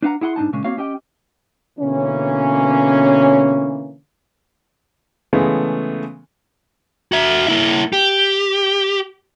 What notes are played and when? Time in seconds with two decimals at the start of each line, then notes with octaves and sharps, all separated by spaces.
0.02 D4 B4 F5 F#5 A#5
0.21 E4 G#4 F#5 B5 C6
0.36 G#2 D4 D#4 A5
0.53 A#2 C#3 G#3 C#4
0.64 A#3 C4 F#4 C#5 F5
0.77 C#4 G4 D#5 G5
1.79 B2 D3 E3 A#3 C#4
5.33 C#3 E3 G#3 A3 B3
7.12 F#4 E5
7.48 A#3 E4
7.93 G4